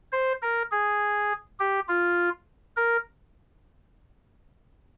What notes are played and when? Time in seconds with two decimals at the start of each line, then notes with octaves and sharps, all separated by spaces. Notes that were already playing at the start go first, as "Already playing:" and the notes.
0.12 C5
0.42 A#4
0.72 G#4
1.60 G4
1.88 F4
2.77 A#4